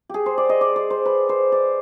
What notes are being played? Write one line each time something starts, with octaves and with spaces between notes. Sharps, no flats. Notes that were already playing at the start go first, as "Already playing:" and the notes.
G4 G#4
C5
D5
D#5
D5
D5
C5
B4
C5
D5